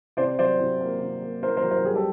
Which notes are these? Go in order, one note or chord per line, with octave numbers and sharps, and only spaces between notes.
C3 C5 D5
F#3 C5 D5
C3
A#3
C3
A#3
A#3 A#4 C5
A#4 C5
F#3
A#4 C5
G3 G#4 A#4
G4 A4